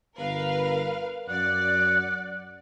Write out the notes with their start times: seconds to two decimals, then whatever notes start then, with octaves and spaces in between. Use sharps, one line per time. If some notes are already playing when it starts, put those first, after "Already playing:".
0.18 G1 A#4 B4 F5
1.28 F#2 D5 F#5